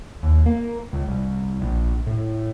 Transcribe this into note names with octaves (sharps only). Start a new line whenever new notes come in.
D#2
A#3
C#2
C2
A#1
A2